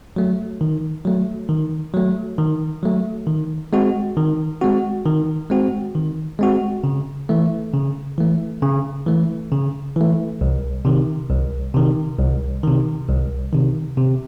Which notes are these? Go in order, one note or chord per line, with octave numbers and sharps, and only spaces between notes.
F#3 A3
D#3
F#3 A3
D#3
F#3 A3
D#3
F#3 A3
D#3
G#3 C4 F#4
D#3
G#3 C4 F#4
D#3
G#3 C4 F#4
D#3
G#3 C4 F#4
C#3
E3 A3
C#3
E3 A3
C#3
E3 A3
C#3
E3 A3
C2
C3 D#3
C2
C3 D#3
C2
C3 D#3
C2
C3 D#3
C3